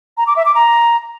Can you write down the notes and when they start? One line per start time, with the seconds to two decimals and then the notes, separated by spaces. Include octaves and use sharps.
0.18 A#5
0.27 D6
0.36 E5
0.46 D6
0.55 A#5